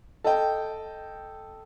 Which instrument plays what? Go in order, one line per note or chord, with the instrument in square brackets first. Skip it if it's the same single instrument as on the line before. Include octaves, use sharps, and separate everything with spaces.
[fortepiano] A4 D#5 G5